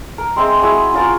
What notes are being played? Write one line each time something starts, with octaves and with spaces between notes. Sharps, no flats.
A#4
G#3 C4 E5 C6
E4 F#4 G#4 E5
F3 C#4 F4 A#4